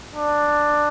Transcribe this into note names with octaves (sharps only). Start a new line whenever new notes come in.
D4